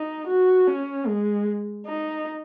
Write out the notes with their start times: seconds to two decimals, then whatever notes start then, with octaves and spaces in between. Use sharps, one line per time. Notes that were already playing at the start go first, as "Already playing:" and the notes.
Already playing: D#4
0.27 F#4
0.67 C#4
1.07 G#3
1.86 D#4